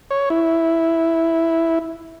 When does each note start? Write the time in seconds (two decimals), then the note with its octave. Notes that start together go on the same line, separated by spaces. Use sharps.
0.11 C#5
0.30 E4